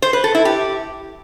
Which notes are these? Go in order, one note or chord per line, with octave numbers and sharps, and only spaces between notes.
C5
B4
A4
E4
G4